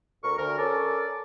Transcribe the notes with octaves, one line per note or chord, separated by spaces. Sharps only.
D2 A#4 C#6
D2 A#4
C#4 A4 A#4 D5